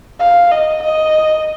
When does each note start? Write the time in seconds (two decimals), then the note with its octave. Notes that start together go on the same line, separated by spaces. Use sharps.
0.19 F5
0.51 D#5
0.83 D#5